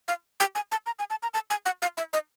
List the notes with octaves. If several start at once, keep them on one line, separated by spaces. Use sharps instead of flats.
F5
G5
G#5
A5
A#5
G#5
A5
A#5
A5
G#5
F#5
F5
E5
D#5